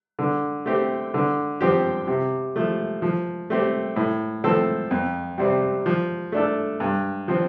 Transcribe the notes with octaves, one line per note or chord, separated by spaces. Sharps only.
D3
A3 C4 G4
D3
F3 C4 G4
C3
F3 A3
F3
A3 C4 G4
A2
F3 A3 C4 A4
F2
C3 G3 C4
F3
A3 D4 A4
G2
F3 C4